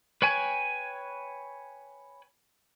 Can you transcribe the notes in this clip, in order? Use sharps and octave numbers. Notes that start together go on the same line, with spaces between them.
B4 C#5 G5 G#5